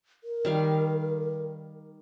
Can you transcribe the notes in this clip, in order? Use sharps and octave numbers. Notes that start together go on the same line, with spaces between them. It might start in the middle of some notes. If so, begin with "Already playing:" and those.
A#4
D#3 G3 F5